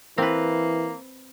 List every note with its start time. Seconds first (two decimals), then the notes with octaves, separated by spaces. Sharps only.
0.18 E3 A#3 C4 B4